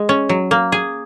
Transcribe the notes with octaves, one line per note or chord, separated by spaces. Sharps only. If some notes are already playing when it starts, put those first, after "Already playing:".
Already playing: G#3
C#4
F#3
A#3
G#4